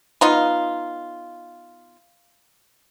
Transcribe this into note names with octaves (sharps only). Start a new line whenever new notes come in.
B3 D#4 F4